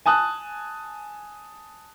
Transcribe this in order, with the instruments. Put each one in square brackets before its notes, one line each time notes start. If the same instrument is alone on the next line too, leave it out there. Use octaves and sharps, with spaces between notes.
[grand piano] G#5 A5 D#6 F#6